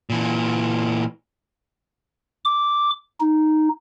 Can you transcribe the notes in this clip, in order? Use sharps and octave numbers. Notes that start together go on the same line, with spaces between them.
A#2 E3
D6
D#4